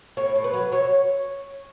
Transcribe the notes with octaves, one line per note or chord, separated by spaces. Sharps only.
A2 C#5
A2
B4
F#3
F#3 C#5